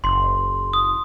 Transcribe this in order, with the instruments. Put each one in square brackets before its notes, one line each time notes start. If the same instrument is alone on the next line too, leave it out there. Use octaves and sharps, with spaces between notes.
[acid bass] F#1 [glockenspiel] C6
[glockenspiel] D#6